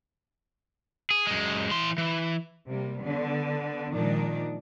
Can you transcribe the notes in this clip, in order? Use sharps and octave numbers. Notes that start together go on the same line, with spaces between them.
G#4
F#2 G#3
E3 C6
E3
C3 G3 A#3
D3 B3
A#2 D#3 F3 G#3 D4 D#4